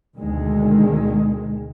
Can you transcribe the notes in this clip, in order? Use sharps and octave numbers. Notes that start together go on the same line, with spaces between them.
D2 B2 D#3 G#3